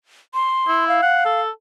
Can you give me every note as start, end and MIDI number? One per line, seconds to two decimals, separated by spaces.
0.34 0.87 84
0.68 1.02 64
0.88 1.40 77
1.02 1.21 78
1.26 1.50 69